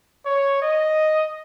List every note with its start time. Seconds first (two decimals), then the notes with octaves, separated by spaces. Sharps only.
0.26 C#5
0.62 D#5